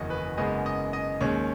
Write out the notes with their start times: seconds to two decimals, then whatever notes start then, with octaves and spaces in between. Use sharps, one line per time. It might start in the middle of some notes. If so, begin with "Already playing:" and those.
Already playing: F#1 E2 D#3 F#3 C#4 D#5
0.10 B4
0.37 F#1 F#2 C#3 G#3 B3 D#5
0.66 D#5
0.93 D#5
1.21 D#2 C#3 G#3 C#4 C#5